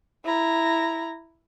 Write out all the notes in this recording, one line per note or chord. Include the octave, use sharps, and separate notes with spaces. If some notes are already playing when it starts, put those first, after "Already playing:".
E4 A#5